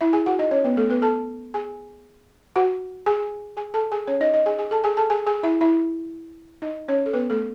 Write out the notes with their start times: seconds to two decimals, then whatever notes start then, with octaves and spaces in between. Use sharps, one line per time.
0.01 E4 E5
0.13 G#4 G#5
0.26 F#4 F#5
0.39 D#4 D#5
0.51 C#4 C#5
0.64 B3 B4
0.77 A3 A4
0.90 B3 B4
1.02 A4 A5
1.54 G#4 G#5
2.56 F#4 F#5
3.06 G#4 G#5
3.57 G#4 G#5
3.74 A4 A5
3.92 G#4 G#5
4.07 C#4 C#5
4.20 D#4 D#5
4.33 D#4 D#5
4.46 G#4 G#5
4.58 G#4 G#5
4.71 A4 A5
4.84 G#4 G#5
4.97 A4 A5
5.10 G#4 G#5
5.26 G#4 G#5
5.43 E4 E5
5.61 E4 E5
6.62 D#4 D#5
6.88 C#4 C#5
7.06 A4
7.13 B3 B4
7.30 A3 A4